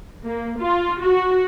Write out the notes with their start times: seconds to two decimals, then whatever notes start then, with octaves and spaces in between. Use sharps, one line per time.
0.25 A#3
0.59 F4
1.01 F#4